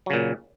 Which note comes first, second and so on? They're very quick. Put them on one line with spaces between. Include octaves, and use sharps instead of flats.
F#3 C#3 A#2